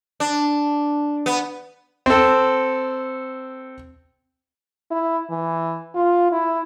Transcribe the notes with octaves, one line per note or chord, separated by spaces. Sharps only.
D4
B3
C4 A4
E4
E3
F4
E4